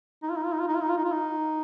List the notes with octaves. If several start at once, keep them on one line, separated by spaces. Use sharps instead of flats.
D#4
F4
D#4
F4
D#4
F4
D#4
F4
D#4
F4
D#4
F4
D#4